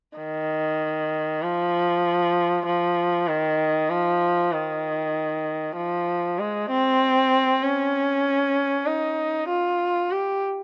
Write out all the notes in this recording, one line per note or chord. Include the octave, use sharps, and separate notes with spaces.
D#3
F3
F3
D#3
F3
D#3
F3
G#3
C4
C#4
D#4
F4
G4